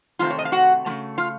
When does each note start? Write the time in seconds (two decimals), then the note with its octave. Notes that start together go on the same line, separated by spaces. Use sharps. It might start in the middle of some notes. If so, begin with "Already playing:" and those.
0.19 C3 D#3 A3 C4 F4 F5
0.30 C#5
0.39 D#5
0.45 F5
0.52 F#4 F#5
0.86 F3 A3
0.89 C#3
1.18 F4 F5